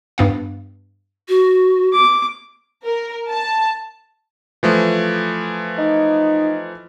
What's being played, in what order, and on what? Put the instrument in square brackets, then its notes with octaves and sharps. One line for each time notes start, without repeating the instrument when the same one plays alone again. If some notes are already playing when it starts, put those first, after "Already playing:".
[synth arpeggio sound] G2 B3 F5
[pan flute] F#4
[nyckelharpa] D6
[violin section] A#4
A5
[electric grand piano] E3 F3 A3
[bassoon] D#4